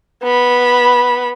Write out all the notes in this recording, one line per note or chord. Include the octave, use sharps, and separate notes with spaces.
B3 B5